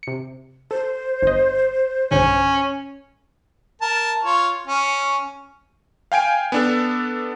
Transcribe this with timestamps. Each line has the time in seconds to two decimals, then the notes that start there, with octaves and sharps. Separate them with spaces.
0.03 C3 C#7
0.71 A4 C5
1.23 G1 D#5
2.11 B1 G2 D3 C#4
3.81 A#4 A5
4.24 F4 C#5
4.67 C#4
6.12 F5 G5 G#5 D7
6.52 B3 D4 A4